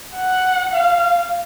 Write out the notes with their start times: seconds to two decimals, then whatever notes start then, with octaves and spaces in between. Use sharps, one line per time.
0.16 F#5
0.74 F5